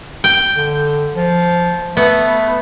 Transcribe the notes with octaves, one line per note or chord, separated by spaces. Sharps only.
G5
D3
F3
A3 B3